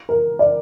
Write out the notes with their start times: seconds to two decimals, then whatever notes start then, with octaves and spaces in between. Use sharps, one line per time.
0.09 A#4
0.39 D5